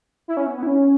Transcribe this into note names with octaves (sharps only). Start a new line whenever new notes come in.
E4
C#4
B3
B3
E4
C#4